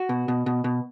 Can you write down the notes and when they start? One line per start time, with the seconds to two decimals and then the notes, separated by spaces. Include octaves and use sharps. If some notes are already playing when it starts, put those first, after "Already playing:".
Already playing: F#4
0.09 B2
0.28 B2
0.46 B2
0.64 B2